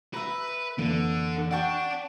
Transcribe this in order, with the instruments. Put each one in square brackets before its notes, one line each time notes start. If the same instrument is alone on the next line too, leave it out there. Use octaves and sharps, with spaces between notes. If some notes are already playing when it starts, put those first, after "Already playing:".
[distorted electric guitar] B4 [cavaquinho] E5 A#5
[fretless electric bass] F2 E3 A#3 [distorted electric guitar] D3
[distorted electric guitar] D5 A5 [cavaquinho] F#5 G5 C#6